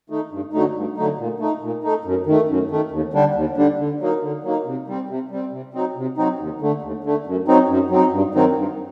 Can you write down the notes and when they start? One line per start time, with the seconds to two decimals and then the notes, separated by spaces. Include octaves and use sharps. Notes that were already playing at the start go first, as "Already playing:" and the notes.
0.10 D#3 A3 D#4
0.31 G2
0.53 D3 F#3 A3 D#4
0.75 G2
0.97 D3 F#3 A3 D#4
1.18 A#2
1.40 A3 D#4
1.62 A#2
1.83 A3 D#4
2.05 F#2
2.26 D#3 A3
2.49 F#2
2.71 D#3 A3
2.91 D#2
3.13 D3 G3 D4
3.35 D#2
3.57 D3 G3 D4
3.79 D3
4.00 F#3 A#3 D#4
4.22 D3
4.44 F#3 A#3 D#4
4.66 C3
4.88 G3 C4
5.09 C3
5.31 G3 C4
5.52 C3
5.74 F#3 C4 D#4
5.96 C3
6.17 F#3 C4 D#4
6.39 D#2
6.61 D3 A3
6.82 D#2
7.04 D3 A3
7.26 F#2
7.48 F#3 C4 D#4
7.69 F#2
7.90 F#3 C4 D#4
8.12 G2
8.34 D#3 F#3 C4 D#4
8.56 G2